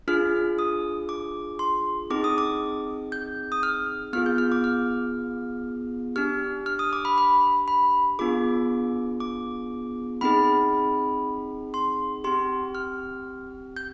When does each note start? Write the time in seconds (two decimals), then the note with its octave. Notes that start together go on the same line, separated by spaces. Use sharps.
0.08 D4 F4 G#4 F6
0.59 D#6
1.09 D6
1.59 C6
2.10 C4 D#4 G#4 D6
2.24 D#6
2.38 D6
3.12 G6
3.52 D#6
3.63 F6
4.13 B3 F4 G#4 F6
4.26 G6
4.38 F6
4.52 D6
4.64 F6
6.16 D4 G4 F6
6.66 F6
6.79 D#6
6.93 D6
7.05 B5
7.18 B5
7.68 B5
8.19 B3 D4 F4 G#4 D6
9.20 D6
10.21 C4 D#4 G#4 B5
11.74 C6
12.24 C4 G4 C6
12.75 F6
13.77 G6